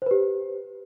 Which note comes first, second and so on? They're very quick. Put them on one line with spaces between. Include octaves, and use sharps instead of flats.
C5 B4 G4